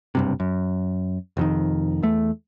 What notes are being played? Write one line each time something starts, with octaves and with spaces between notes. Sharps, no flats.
F#1 G2 C3
F#2
F1 F2 D#3
E2 A3